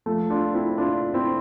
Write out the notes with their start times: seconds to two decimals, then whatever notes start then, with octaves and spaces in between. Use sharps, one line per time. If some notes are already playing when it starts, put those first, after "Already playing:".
0.06 F3 A3
0.30 D4 F4
0.54 C4 E4
0.78 D4 F4
1.14 C4 E4